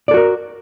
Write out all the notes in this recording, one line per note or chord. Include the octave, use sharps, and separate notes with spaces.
F#4 A4 A#4 D5